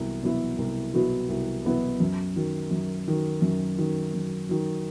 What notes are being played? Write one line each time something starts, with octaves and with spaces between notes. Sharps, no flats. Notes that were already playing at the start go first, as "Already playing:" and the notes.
Already playing: C2 F#3 B3
B2 F#3 B3 E4
C2
B2 F#3 B3 E4
C2
B2 F#3 B3 E4
F#2
D#3 F#3
F#2
D#3 F#3
F#2
D#3 F#3
F#2
D#3 F#3